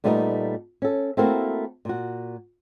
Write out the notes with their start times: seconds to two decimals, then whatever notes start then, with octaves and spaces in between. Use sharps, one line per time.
0.04 A#2 G3 A3 B3 D#4
0.82 C#4 A4
1.17 A3 A#3 C4 E4 F#4 A#4
1.85 A#2 F#4